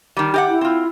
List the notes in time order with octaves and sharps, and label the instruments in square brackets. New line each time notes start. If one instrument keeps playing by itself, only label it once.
[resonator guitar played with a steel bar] D#3 G3
G4 D#5 F#5
[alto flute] E4
[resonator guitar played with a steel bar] C4 F4